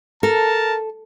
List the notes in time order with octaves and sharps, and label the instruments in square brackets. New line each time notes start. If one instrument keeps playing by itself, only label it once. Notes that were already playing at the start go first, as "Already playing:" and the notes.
[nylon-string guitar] A4 [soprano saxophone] A#4 [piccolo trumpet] A5